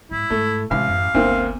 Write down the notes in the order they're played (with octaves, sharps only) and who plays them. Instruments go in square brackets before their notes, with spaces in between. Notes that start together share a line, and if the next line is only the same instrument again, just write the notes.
[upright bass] G#2 [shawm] E4
[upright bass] G#2 [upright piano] A3
[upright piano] A1 [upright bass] C3 G#3 [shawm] F5
[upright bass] F#2
[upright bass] G1 D4 [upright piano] D2 A#3 C4